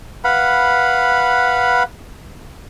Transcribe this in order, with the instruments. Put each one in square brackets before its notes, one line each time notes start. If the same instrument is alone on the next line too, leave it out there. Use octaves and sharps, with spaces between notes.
[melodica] B4 F5 F#5 B5